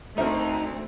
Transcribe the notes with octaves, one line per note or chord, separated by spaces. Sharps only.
D2 A3 C4 D#4 A#4 C5 E5